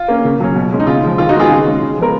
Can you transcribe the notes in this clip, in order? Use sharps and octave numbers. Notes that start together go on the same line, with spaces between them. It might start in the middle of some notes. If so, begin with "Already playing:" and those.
Already playing: F4
A#3 C#4
C#3
F#3 C#4
B2
G#3 C#4
D#4
C#3 F4
F3 G#3
D#3 F4
D#4 F#4
G#3 B3 F4 G#4
C#3
G#3 C#4
C#3
F3 G#3 B3 A#4